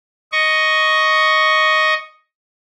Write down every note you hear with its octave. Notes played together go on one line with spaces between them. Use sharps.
D#5 C#6